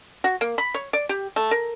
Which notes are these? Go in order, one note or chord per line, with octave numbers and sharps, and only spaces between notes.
F#4
A#3
B5
C#5
D5
G4
A3
A#4